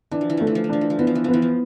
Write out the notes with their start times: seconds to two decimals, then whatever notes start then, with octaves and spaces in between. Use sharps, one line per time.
0.11 E3 D4
0.21 F3
0.30 E3
0.37 F3 A3
0.47 E3
0.55 F3
0.64 E3
0.69 F3 D4
0.81 E3
0.90 F3
0.98 E3 B3
1.07 F3
1.15 E3
1.24 F3 B3
1.34 E3
1.42 F3